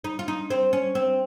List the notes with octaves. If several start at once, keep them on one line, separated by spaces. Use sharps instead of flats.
D#4
F4
D#4
C4
C#4
C4